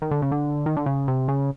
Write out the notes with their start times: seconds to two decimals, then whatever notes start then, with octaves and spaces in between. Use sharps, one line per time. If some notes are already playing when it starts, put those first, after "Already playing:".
0.02 D#3
0.11 D3
0.22 C#3
0.32 D3
0.66 D#3
0.77 D3
0.86 C#3
1.08 C3
1.28 C#3